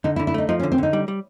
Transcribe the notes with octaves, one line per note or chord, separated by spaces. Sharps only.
D3 D#4
E4
D3
E4
A3 D#4
F3 D#4
C#4
D3
C4
D3 D#4
G3
G3